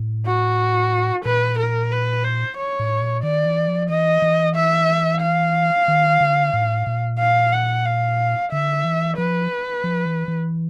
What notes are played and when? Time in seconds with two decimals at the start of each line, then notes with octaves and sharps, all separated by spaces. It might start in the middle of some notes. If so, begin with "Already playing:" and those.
Already playing: A2
0.26 F#4
1.25 A#2 B4
1.59 A#4
1.92 B4
2.24 C5
2.58 C#5
2.80 A2
3.01 A#2
3.23 D#3 D5
3.45 E3
3.68 F3
3.89 E3 D#5
4.22 E3
4.56 E5
5.22 F5
5.88 D#3
6.21 D3
6.54 A2
6.87 A#2
7.19 F5
7.53 F#5
7.86 F5
8.52 D3 E5
8.84 E3
9.17 F3 B4
9.84 F3
10.06 E3
10.28 E3